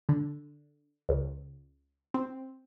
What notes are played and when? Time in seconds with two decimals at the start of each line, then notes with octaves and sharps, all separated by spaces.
0.09 D3
1.09 C#2
2.14 C4